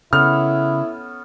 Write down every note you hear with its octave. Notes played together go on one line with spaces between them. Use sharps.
C#3 B3 C#4 E4 A4 F6